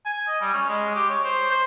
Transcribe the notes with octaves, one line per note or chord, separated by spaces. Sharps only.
G#5
D#5
G3
C#4
G#3
G4
C#5
C5
C5